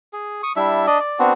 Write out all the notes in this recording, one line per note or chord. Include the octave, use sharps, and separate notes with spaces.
G#4
C#6 D#6
G3 D4 E4 E5
D4 D5 D#5
D5
B3 C4 D4 F#4